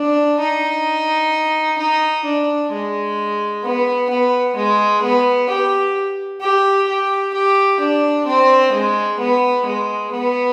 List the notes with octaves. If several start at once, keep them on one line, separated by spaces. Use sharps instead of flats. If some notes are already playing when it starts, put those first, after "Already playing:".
Already playing: D4
D#4
D#4
D4
G#3
B3
B3
G#3
B3
G4
G4
G4
G4
D4
C4
G#3
B3
G#3
B3